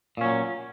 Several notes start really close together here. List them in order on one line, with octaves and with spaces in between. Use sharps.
A#2 C#4 F#3